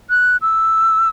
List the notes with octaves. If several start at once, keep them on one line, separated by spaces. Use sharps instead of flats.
F#6
E6